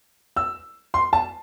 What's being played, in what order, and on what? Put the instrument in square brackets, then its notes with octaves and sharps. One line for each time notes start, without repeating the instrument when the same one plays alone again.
[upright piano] E6
C6
A5